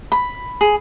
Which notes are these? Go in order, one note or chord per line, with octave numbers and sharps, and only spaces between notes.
B5
G#4